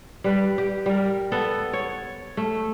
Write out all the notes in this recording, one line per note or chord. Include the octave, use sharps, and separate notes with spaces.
G3 B4
G4
G3 A#4
B3 A4
C#5
A3